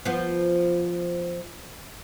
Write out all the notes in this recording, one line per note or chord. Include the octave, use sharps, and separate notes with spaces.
F3 B3